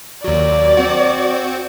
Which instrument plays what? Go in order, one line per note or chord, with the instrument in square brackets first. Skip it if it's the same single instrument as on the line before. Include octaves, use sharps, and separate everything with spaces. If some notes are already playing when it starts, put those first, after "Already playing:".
[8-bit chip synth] D#2 F#3 [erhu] D5
[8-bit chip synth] C4 F#4